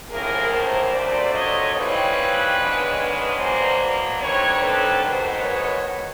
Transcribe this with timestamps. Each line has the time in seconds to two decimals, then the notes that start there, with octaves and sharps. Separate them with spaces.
0.10 A2 F3 A#3 C#4 G#4 A#4
0.52 A#4 C5
0.93 D#2 D3 F#3 A3 C4 C5 D5
1.33 C#5 D#5
1.74 C#3 E3 G3 C4 D#4 B4 C#5
2.56 G#2 D#3 G#3 B3 D4
3.39 B2 F#3 A#3 C5 D5
4.22 D3 G3 C4 D#4 B4 C#5
4.62 A4 B4
5.03 G#2 D#3 F#3 B3 D#4 A#4 C5
5.45 B4 C#5